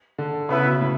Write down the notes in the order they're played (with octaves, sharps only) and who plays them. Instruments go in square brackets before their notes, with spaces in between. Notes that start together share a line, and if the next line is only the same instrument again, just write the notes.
[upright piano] D3
[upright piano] C#3 [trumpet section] B3 E4 B4 E5
[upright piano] B2
A2